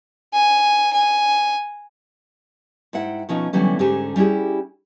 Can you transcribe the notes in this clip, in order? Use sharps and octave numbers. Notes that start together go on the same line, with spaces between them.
G#5
G#5
G#2 E4 F#5 G5
B2 F3 C#4 D#4
D3 E3 F#3 G3 B3 C#4
G#2 D3 C#4 G4 G#5 A5
G3 C#4 E4 G4 G#4